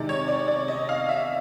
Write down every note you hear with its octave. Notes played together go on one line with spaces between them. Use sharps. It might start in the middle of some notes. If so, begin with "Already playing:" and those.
Already playing: C3 D#3 G#3 D5
C#5
D5
D5
D#5
F5
E5